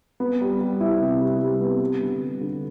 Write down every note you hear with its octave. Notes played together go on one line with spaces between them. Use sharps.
B3
G3
G3
E4
C3
G3
G3
B3
G3
D3
G3
D3